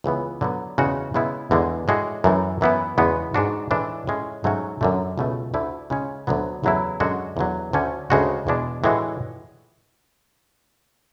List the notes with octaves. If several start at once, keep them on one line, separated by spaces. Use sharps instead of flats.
C#2 C#3 E3 B3
D3 F#3 B3
E2 C#3 G#3 C#4 F#4
C#3 G#3 B3 E4
E2 D3 G#3
A2 G#3 D4 F#4
F#2 E3 A3
F#2 E3 B3 E4
E2 C#3 G#3 B3 F#4
G#2 G#3 D4 F#4
A2 E3 G#3 D4
A2 G#3 C#4
G#2 F#3 A3 C#4 F#4
F#2 D3 A3
C#2 B2 A3
D2 D3 A3 E4
C#3 G#3 C#4
D2 D3 F#3 B3
E2 C#3 F#3 A3 E4
F#2 D3 G#3 C#4 F#4
E2 D3 F#3
D2 D3 A3 C#4
D2 C#3 G#3 D4 F#4
E2 B2 G#3 D4
A2 E3 G#3 D4 F#4